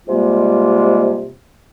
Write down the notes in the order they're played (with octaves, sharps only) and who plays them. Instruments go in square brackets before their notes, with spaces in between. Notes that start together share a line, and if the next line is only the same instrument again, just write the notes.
[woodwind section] G#2 C3 G3 G#3 A#3 F4